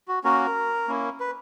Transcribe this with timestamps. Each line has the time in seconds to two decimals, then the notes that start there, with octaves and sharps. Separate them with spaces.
0.08 F#4
0.24 A#3 C#4 F#4 A#4
0.87 A#3 C#4 E4
1.20 B4